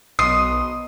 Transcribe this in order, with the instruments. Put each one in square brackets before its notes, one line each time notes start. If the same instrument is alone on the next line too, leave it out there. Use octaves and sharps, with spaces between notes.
[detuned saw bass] B1 [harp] B3 C5 D#5 [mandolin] C6 [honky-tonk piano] D#6